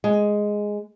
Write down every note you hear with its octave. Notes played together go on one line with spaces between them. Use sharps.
G#3